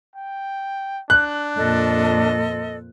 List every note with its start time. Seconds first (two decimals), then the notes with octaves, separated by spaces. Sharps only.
0.16 G5
1.10 D4 F#6
1.57 F2 A#2 A4 D#5